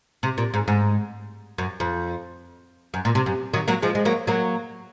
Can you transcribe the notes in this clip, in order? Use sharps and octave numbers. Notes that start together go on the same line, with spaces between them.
C3
A#2
G#2
G#2
F#2
F2
F#2
A#2
C3
F#2
D#3 F#3
F#3 A#3
F3 G#3
G#3
F#3 A#3
F#3 A#3